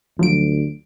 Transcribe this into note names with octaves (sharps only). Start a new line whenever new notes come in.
D2 F3 F#3 D7